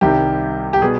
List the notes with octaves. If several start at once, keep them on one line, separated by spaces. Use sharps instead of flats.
C2 C3 D#3 G3 G4
G4
B2 G3 B3 G#4